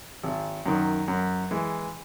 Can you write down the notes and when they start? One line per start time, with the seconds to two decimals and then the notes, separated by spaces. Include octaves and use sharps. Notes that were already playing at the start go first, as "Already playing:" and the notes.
0.23 G#1
0.66 F#2 D#3
1.08 F#2
1.51 E3 G#3